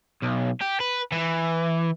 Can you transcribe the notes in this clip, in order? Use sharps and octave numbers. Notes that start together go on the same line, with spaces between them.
B1
G4
B4
E3